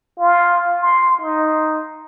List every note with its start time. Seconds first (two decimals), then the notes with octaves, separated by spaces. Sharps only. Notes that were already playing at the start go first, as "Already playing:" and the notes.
0.19 F4
0.80 C6
1.21 D#4